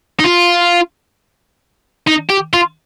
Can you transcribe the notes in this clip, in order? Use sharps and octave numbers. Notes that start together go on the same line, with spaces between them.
D#4
F4
D#4
G4
F4